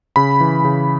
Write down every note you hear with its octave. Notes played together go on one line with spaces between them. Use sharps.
C#3 B5
E3
C#3